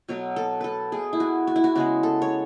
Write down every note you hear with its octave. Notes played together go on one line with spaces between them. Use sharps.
B2 F#3 A3 C#5
A4
A4 B4
B2 A3 G#4
E4
F#4
F#4
E4
F#4
C#3 G#3 B3 F#4
A4
C#5